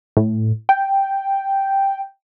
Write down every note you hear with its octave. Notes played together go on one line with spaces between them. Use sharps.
A2
G5